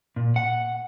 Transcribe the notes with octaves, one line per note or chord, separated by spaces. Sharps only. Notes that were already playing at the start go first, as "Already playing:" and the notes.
A#2
F#5